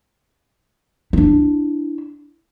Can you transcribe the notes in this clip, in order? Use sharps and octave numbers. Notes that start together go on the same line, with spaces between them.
D4 E4